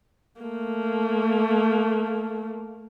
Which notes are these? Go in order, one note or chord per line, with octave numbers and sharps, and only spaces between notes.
A3 A#3